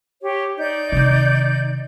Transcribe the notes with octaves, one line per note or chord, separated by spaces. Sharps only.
G4 C#5
D#4 D5 G6
C3 D#3